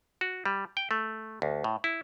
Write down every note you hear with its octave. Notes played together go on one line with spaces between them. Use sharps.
F#4
G3
G5
A3
D2
A2
E4